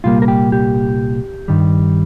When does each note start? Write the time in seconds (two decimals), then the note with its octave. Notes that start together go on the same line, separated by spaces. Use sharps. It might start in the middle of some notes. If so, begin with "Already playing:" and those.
0.04 C2 A#2 G3 A#3 F4
0.22 A#4
0.28 G4
0.52 G4
1.48 G2 D#3 G3